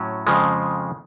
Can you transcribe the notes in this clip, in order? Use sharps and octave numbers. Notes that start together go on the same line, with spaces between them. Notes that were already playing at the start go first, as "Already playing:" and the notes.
Already playing: A2 F#3 C#4
F2 C#3 F3 G#3